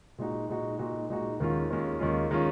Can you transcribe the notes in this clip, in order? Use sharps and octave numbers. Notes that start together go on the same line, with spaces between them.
A#2 G#3 D#4 F#4
A#2 G#3 D#4 F#4
A#2 G#3 D#4 F#4
A#2 G#3 D#4 F#4
D#2 D#3 G#3 C#4 F4
D#2 D#3 G#3 C#4 F4
D#2 D#3 G#3 C#4 F4
D#3 G#3 C#4 F4